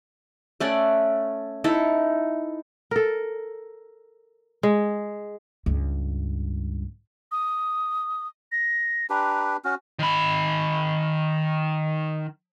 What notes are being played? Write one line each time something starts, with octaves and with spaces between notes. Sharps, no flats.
A3 C#4 D5 F#5
D#4 E4 A4
A4 A#4
G#3
C#2 G2
D#6
A#6
D4 G4 B4 A#5
C#4 F#4 F6
D#3 B5